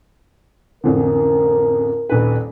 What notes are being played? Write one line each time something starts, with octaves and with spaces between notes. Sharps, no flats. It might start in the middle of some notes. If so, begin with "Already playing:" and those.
A1 F2 D3 A#4
D#1 A#1 B4